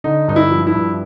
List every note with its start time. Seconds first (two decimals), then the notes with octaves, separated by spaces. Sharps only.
0.04 D3 D#4
0.28 G2 D#4
0.36 E4
0.51 F3
0.67 E4
0.75 G2